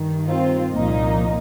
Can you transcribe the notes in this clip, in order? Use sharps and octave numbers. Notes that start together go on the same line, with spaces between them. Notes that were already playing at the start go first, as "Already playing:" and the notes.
Already playing: G2 D#3
C4 F4
C2 A#2 F3 A#3 D#4